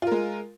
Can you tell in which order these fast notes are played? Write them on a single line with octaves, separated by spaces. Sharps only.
F4 A#4 G#3